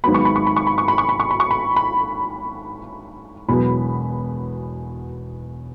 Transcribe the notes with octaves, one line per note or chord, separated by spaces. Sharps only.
G#1 G#2 F#3 B3 B5
C#6
B5
C#6
B5
C#6
B5
C#6
B5
C#6
B5
C#6
B5
C#6
B5
B5
E1 E2 B2 F#3 B3 B5